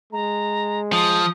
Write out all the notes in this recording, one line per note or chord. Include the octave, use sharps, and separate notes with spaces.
G#3 A#5
F3 D#6